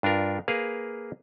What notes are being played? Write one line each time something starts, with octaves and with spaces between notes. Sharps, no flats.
G2 D4 F4 A#4
A#3 G#4 A#4 B4 F5